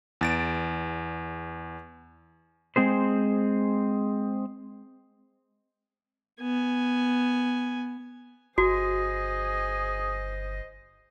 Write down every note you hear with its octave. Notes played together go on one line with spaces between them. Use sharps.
E2 A6 D7
G#3 C4 G#4 C5
B3 G#5
G1 F#4 G#4 C5 D#5